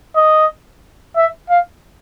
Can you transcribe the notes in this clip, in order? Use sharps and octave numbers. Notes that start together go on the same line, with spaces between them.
D#5
E5
F5